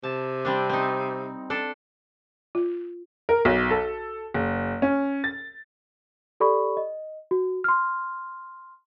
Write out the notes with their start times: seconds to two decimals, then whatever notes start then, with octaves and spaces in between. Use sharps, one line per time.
0.03 C3 A5
0.45 G3 C4 D4
0.69 C4 D#4
1.50 D4 A4
2.55 F4
3.29 A#4
3.45 B1
3.70 A4
4.34 F#1
4.82 C#4
5.24 A6
6.40 G4 A4 D5 B5 C#6
6.77 D#5
7.31 F#4
7.64 C6 F6